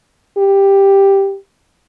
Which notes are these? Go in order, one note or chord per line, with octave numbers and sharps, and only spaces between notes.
G4